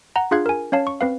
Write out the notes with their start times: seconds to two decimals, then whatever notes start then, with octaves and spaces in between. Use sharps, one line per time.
0.16 F#5 A#5
0.31 D4 F4 G#4 F5 F#6 G#6
0.46 A#4 G#5
0.72 C#4 C#5 F5 A5
0.87 C#6
1.01 C4 B4 F5